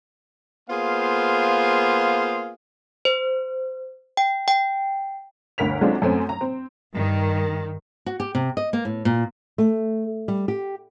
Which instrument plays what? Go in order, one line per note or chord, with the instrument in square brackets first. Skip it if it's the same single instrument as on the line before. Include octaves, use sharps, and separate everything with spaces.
[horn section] A#3 B3 F4 G#4 C5 F5
[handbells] C5
G5
G5
[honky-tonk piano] G1 D2 A#4 B6 F7
F#3 G#3 C4 D4 F4 A4
F#2 A3 C4 C#4
A#5
C4
[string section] G2 D#3
[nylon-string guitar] F#4
G4
C3
D#5
A#3
A2
A#2
A3
G3
G4